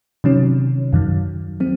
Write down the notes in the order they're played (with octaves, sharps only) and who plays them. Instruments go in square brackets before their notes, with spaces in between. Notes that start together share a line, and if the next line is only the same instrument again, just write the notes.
[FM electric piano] C3 D#3 F#3 C#4
F#2 D#3 F#3
F#3 C4